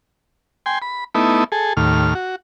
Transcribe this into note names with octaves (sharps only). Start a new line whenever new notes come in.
G5 G#5 C6
B5
A3 B3 D#4 E4
G#4 A4
D#2 A2 F6
F#4